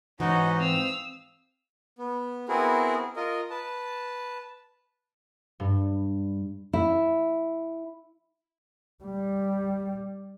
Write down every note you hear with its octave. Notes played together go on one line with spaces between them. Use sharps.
G#2 E3 C#4 D#4 F#4 D#5 F#5
C4 F5 D#6 E6
B3
B3 C4 E4 F#4 G#4 A#4
F4 A#4 D#5
B4 A5
G2
E4
G3